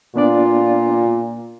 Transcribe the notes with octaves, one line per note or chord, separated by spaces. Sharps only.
A#2 B3 D4 F4 D5